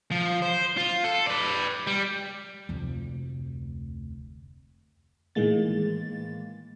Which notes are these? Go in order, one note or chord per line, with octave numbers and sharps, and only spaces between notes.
F3
C5
F4
A4
B4 D5
G3
F1 D2
A2 D#3 E3 G#3 A#3 A6